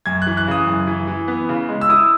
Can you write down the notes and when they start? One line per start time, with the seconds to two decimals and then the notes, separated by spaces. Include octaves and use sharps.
0.06 F#2 G#6
0.22 E3 F#6
0.37 F#6
0.47 C#3 D#6
0.67 F#2
0.87 E3
1.07 E3
1.28 B3
1.49 C#3
1.69 G#3
1.81 E6
1.89 E4 D#6